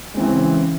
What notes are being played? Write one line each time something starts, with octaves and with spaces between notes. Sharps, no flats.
C#3 E3 G#3 C4